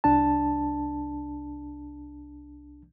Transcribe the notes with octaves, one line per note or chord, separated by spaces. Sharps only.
C2 D4 A5